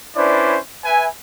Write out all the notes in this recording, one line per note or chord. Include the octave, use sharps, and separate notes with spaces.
C#4 D4 E4 B4 C5 D5
B4 E5 G#5